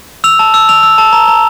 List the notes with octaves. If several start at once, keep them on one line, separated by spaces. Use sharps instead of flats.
E6 F7
A5
E6
E6 F7
E6
A5
A#5
A#5